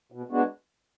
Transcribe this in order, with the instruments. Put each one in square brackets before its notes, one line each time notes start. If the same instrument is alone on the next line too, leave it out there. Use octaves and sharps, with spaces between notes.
[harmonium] B2
G#3 B3 D4 F#4